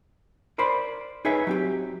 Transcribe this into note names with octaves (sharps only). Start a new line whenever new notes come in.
A#4 C5 D5 B5
D#4 G#4 B4 C#5 E5
F#3 C4 G4